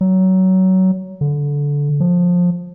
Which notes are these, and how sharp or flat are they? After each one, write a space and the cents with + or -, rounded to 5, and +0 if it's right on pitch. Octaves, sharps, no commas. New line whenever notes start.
F#3 +20
D3 -20
F3 +20